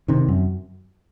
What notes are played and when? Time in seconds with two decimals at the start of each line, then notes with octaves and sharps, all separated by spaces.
0.08 C3 D#3
0.28 F#2